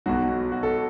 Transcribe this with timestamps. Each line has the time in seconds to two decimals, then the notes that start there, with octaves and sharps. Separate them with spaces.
0.06 B1 B2 F#3 F#4
0.52 F#4
0.63 A4